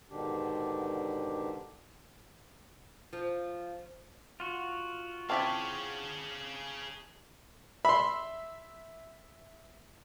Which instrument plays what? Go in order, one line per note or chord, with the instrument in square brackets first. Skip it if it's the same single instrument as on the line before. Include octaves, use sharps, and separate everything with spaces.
[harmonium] G#2 B2 D3 D#3 D4 G4
[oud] F3
[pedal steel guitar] F4 F#4
[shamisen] C4 C#4 E4 [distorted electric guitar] G#4 F5 [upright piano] A5 D6 B6
[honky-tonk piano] E5 [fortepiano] B5 C6